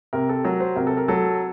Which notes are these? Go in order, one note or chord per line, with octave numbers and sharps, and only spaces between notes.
C3 A#4
A4
F#3 A#4
C5
C3 A#4
A4
A#4
F#3 A4